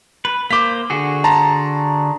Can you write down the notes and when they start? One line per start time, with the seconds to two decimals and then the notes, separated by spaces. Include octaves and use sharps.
0.25 B4
0.51 A#3 C5 D6 B6
0.90 D3 F#4 G#4
1.24 A5 A#5 C6